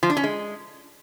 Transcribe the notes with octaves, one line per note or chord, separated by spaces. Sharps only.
F3
D4
C#4
G#3